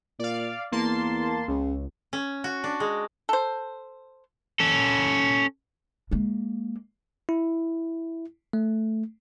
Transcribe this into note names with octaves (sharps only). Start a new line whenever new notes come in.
A#2 D5 F5
E2 A#3 A5 C6
C#2 C#3
C#4
F#4
D4
G#3
A4 C5
C#4 A4
G#3 A#3
E4
A3